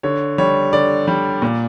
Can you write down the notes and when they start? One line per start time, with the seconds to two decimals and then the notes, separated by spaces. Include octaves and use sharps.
0.03 D3 C#5
0.38 G3 C#5
0.73 D3 D5
1.08 G3
1.42 A#2